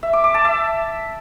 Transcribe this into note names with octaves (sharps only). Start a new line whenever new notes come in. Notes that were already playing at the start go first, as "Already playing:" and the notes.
E5
D6
D6
A5
E5